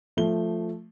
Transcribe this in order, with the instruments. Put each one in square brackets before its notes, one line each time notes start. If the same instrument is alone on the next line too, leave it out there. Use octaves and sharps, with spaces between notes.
[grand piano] F3 A3 G7